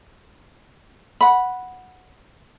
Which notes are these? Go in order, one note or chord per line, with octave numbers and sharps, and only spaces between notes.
F#5 B5